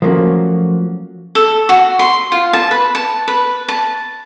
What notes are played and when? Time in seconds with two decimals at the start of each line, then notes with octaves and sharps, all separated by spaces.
0.02 F3 F#3 A3 A#3 C#4 F#4
1.35 A4
1.69 F#4
1.99 C6
2.32 F4
2.53 A5
2.71 B4
2.95 A5
3.28 B4
3.68 A5